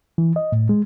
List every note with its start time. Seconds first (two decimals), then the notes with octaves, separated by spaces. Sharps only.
0.18 E3
0.36 D#5
0.52 A2
0.69 G#3